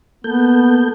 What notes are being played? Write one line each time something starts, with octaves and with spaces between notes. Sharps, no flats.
A#3 B3 A4 G6